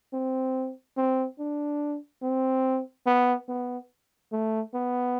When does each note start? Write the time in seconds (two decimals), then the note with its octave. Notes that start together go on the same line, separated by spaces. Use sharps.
0.14 C4
0.97 C4
1.39 D4
2.22 C4
3.06 B3
3.49 B3
4.32 A3
4.74 B3